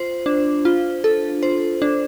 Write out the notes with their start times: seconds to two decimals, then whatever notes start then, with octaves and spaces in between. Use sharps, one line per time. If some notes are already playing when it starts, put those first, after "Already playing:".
Already playing: F4 C5
0.26 D4
0.65 F4
1.04 A4
1.43 C5
1.82 D4